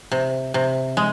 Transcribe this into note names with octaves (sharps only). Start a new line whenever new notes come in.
C3
C3
G#3